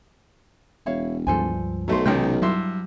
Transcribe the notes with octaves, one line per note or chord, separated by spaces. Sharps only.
E1 E4 C#5 F5
C#2 G2 F3 A4 C5 G#5
B1 F#3 A3 A#4 C5
C#2 C3 D#3 G#3 C#4 C5 G5
G2 F#3 E4 C6